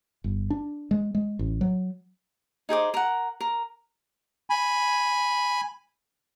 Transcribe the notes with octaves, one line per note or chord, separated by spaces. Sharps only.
G1
D4
G#3
G#3
A1
F#3
D#4 G#4 C5 D6
A#4 F#5
A#4
G#5 B5